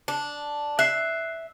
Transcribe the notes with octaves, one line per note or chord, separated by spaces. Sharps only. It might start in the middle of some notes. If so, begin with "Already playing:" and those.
D4
E5 F#6 C7